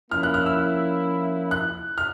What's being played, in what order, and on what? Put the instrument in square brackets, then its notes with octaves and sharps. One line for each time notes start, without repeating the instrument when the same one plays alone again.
[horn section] F3 A#3 C#4 E4 [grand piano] F6
[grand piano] F#6
F6
E6
F#6
F6